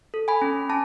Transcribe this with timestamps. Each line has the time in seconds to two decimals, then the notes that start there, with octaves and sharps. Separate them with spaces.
0.14 A4
0.28 G#5 B5
0.42 C#4
0.69 C#4 A5